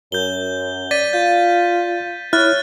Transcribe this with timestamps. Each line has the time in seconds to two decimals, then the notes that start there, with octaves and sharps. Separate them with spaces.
0.12 F#2 G6 G7
0.91 D5 A6 B6 D#7
1.13 F4 G6
2.33 E4 C#5 F6 F#6 A6